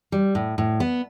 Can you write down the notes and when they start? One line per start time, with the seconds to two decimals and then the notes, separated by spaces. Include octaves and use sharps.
0.12 G3
0.35 A2
0.58 A2
0.80 B3